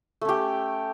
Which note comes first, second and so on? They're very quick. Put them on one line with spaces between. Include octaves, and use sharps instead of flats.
A3 C#4 G4